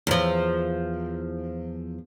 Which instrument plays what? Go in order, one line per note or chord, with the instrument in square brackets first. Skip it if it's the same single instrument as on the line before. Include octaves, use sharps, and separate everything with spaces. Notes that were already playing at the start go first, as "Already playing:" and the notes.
[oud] E2 F3